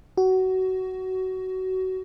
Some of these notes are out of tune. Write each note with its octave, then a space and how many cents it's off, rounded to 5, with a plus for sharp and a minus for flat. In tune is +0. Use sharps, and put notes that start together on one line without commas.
F#4 +20